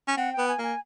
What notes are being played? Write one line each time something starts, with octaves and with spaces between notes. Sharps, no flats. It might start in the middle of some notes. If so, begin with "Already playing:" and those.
C#4
C4 F#5
G5
B3
G#5
A#3 G#5